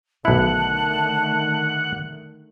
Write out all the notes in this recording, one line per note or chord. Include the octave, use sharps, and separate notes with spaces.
B1 D3 D#3 A3 E4 F#5 A5